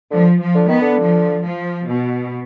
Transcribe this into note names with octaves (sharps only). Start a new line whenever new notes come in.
D3 F3
F3
D3
D#3 B3
D3
F3
F3
B2